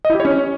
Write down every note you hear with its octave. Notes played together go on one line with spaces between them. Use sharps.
D#5
E4
G4
C#5
C#4